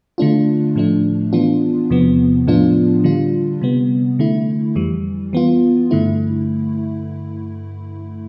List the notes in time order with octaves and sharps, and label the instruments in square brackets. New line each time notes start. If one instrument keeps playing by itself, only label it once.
[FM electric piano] D3 A3 D4 F4
A2 F3 A3 D4
E3 B3 D4 F4
E2 C3 F3 B3
A2 F3 B3 D4 F4
D3 G3 D4 F4
C3 G3 B3
D3 A3 E4
F2 E3 G3
E3 B3 F4
G2 D3 A3 E4